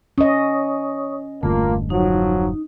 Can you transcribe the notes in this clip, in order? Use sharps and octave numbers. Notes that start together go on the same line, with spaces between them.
C#4 C#5 D#5 C#6 D#6
E1 G2 D3 A3 A#3 F4
F3 F#3 D#4